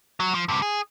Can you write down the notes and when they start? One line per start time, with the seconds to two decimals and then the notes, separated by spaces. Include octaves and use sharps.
0.20 F#3
0.35 F3
0.49 G2 C3
0.62 G#4